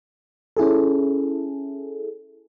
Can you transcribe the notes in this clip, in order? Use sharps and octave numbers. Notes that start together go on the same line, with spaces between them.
C#4 E4 G#4 A4